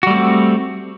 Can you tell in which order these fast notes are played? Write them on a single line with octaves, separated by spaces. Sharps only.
F#4 G3 A3 C4